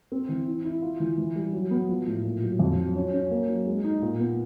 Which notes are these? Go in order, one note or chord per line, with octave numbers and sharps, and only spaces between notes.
C4
E3
E4
E4
F4
E3
E3
G3
F#3
B3
F3
A2
A#2
F#3
F2
F#3
C#4
C#4
A#3
F#3
G#3
D#4
A#2
B3